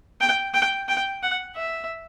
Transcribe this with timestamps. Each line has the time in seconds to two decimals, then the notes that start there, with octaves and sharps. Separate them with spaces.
0.21 G5
0.54 G5
0.89 G5
1.23 F#5
1.56 E5